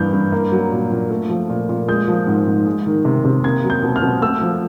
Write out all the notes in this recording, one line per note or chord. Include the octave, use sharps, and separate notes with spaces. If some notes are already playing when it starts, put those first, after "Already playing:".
Already playing: G2 E3 A#3 G6
G2
A#3
F#3
A#2
A#2
A3
F3
A#2
A#2
G#3 G6
F3
G#2
G#2
G#3
D#3
C3
C3
A#3 G#6
F#3
G6
B2
F6
B2
A3 E6
F3